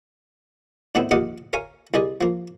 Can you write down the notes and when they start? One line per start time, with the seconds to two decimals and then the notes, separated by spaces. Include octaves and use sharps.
0.95 A2 D3 D#3 B3 C4 E4
1.11 A#1 D#2 D#5 F5 F#5 D6
1.53 A#4 C#5 F5 G#5
1.94 C2 G#4 D5 D#5
2.21 F3 A#3